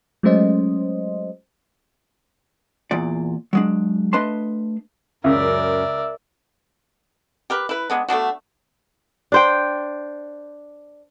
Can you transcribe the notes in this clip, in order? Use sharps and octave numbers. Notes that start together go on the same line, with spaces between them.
F#3 G#3 A3 C#4 C5 D#5
E2 A#2 D5
F#3 G#3 D4
A3 D4 B4 D#5 A5 C6
C#2 F#2 C#3 A#4 D5 E5
G4 A#4 B4
E4 B4
G#3 B3 D4
A3 B3 D4 F#4
D4 C5 G5